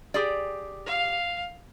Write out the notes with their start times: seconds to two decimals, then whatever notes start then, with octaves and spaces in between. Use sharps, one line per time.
0.14 G4 G#4 D5
0.86 F5